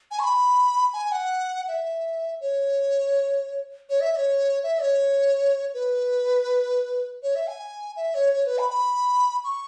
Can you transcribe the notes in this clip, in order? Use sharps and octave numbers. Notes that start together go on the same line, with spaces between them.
G#5
C#6
B5
G#5
F#5
E5
C#5
C#5
E5
E5
C#5
E5
C#5
B4
C#5
E5
G#5
E5
C#5
C#5
B4
B5
B5
C#6